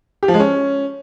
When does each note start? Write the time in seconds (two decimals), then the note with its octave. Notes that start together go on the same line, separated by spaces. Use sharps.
0.23 G4
0.28 F3
0.34 G#3
0.40 C#4